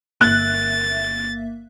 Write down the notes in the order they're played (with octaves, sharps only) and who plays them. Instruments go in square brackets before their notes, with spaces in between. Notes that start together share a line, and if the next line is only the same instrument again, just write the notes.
[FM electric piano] G1 A#3 E5 [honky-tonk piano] F#6 [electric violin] A6